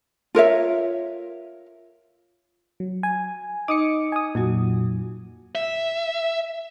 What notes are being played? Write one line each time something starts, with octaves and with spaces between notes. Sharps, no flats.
F4 A#4 C#5 E5
F#3
G#5
D#4 D#5 D6 D#6 C#7
G#5 D#6
F2 A#2 F#3 F#4
E5